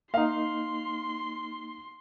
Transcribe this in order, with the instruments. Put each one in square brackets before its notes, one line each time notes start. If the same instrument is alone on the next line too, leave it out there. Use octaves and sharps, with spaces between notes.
[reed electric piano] A#3 D#4 [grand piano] F5 [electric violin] C6